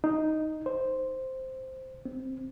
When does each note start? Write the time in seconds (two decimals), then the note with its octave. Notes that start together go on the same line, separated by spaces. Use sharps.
0.04 D#4
0.66 C5
2.05 C4